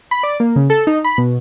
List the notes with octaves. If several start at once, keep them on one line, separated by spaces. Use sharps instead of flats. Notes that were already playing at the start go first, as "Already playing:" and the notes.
B5
D5
A#3
C#3
A4
D#4
B5
B2